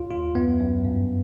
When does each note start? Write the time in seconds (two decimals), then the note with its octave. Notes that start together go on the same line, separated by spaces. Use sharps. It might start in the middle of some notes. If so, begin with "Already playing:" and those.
Already playing: D#2 F4
0.11 D#2 F4
0.35 F#2 B3
0.60 F#2
0.85 G2